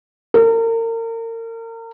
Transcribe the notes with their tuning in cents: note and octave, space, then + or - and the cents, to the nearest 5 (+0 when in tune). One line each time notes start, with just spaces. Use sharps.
A#4 -35